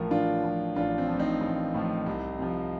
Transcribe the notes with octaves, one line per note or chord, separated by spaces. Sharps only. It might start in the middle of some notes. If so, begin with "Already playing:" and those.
Already playing: A1 A2 F3 A#4
A1 D4 F4
A2 F3
A1 D4 F4
C4
A2 F3
C4 D#4
A1
A2 F3
C2
C3 F3